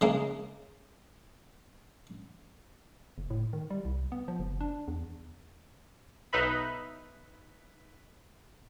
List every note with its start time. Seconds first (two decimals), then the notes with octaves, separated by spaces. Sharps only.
0.01 C#3 G#3 A#3
3.18 F#1
3.30 A2
3.53 D#3
3.70 G3
3.85 C2
4.12 B3
4.28 F3
4.40 F#1
4.61 D4
4.88 E2
6.33 B1 D#4 B4 E5 B5